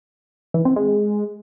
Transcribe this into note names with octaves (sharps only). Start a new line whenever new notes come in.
E3
C4
G#3